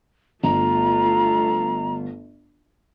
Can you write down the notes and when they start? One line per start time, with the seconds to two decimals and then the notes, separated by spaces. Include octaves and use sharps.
0.44 G1 A3 F4 A#5